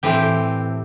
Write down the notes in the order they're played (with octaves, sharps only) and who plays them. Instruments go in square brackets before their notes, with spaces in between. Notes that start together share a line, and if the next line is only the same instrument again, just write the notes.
[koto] A2 E3 C4 G4